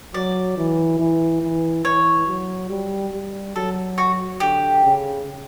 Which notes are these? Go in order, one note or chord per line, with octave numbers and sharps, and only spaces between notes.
F#3 D5
E3
E3
E3
E3 C#5
F#3
G3
G3
F#3 A4
F#4
D3 G4
C#3